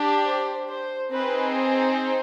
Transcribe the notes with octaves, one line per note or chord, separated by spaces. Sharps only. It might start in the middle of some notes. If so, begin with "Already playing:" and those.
Already playing: D4 G4
C5
C5
C4 D#4 G#4 B4
C5